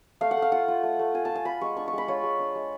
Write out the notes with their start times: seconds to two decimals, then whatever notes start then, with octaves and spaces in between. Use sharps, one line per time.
0.21 A3 F5
0.31 F#5
0.37 A3
0.42 F5
0.52 F4 F#5
0.68 F4
0.83 A3
0.99 A3
1.14 F4 G#5
1.25 A5
1.30 F4
1.35 G#5
1.45 F4 B5
1.61 G#3 C#6
1.76 D4 C#6
1.88 C#6
1.93 G#3 B5
2.08 F4 C#5
2.23 G#3
2.39 D4
2.55 G#3